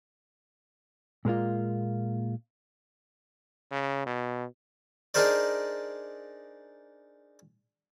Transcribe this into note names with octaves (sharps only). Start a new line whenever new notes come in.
A#2 G#3 A#3 F4
C#3
B2
D4 D#4 G#4 A#4 C5 D5